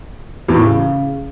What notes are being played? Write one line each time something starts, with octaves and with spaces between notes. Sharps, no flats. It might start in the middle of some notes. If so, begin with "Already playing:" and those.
E2
A2
E3
C#3